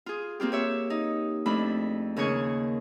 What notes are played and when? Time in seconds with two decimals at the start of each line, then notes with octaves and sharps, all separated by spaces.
0.06 F4 G#4
0.40 A#3 C4 F4 G4
0.52 G4 C#5 E5
0.90 D#4
1.46 F2 A3 D4 B5
2.16 D#2 C#3 A#3 G#4 C#5 C#6